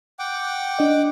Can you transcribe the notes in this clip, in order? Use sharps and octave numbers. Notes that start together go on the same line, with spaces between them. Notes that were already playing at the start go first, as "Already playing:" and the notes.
F#5 G5 D6
D4 D#5